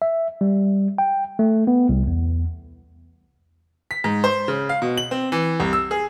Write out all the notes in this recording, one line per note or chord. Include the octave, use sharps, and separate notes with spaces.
E5
G3
G5
A3
B3
C2
E2
B6
G#2
C5
C#3
F5
B2
F#7
C4
E3
C2
E6
G#4